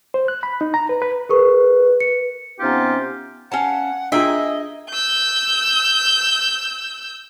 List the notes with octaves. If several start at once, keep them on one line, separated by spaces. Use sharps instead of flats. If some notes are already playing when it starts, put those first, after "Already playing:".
C5
F#6
B5
D#4
A#5
B4
B4
G#4 A#4 B4 C#6
C#7
C3 B3 C#4 D#4 F4 G4
C#4 F5 F#5 A5
A#3 D4 F4 G#4 D#5 E5 G5
E6 G6